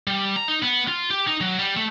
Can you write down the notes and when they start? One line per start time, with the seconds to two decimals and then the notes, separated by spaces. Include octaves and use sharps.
0.07 G3
0.36 A#5
0.48 D#4
0.63 B3
0.88 F4
1.10 G4
1.27 D#4
1.41 F#3
1.59 G3
1.77 A3